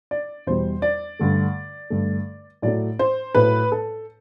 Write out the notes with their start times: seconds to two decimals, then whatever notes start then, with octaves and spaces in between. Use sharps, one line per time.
0.11 D5
0.47 E2 B2 G3 C5
0.82 D5
1.19 G2 D3 A3
1.90 G2 D3 A3
2.62 A2 F#3 A3 D5
2.99 C5
3.35 A2 F#3 A3 B4
3.72 A4